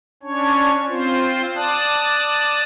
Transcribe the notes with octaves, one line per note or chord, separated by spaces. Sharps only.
C#4 D4 C#5
C4 F4 C5
D5 A5 D#6 F#6